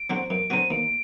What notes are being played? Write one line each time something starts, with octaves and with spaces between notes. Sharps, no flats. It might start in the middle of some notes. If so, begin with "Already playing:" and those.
Already playing: D7
D3 F#3 C4 F#4
F#2 D7
D3 F#3 C4 F#4 D#7
D#2 D7